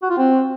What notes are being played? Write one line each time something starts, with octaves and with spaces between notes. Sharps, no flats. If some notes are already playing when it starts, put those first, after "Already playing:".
F#4
F4
C4